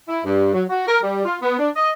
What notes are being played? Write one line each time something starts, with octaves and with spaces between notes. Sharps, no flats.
E4
G2
F#3
F#4
A#4
G3
F4
B3
D4
D#5